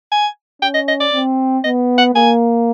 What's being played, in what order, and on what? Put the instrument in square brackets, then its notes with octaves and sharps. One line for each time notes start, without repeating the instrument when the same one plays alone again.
[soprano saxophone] G#5
[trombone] C#4 [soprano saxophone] G5
[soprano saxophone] D#5
D#5
D5
[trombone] C4
[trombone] B3 [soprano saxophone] D#5
[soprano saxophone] F#5
[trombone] A#3 [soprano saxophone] G#5